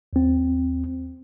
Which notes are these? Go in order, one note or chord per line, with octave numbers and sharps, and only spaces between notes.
D#2 C4